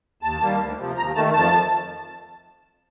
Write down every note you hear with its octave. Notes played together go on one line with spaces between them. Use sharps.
D#2 A5
D#3 G3 A#3
D2
C3 F3
D#2 A#5
D#3 A3 A5
F2 A5